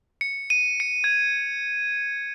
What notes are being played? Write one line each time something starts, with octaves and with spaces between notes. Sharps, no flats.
C#7
D#7
C#7
G#6